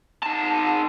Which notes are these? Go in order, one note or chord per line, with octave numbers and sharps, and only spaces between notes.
D#3 A5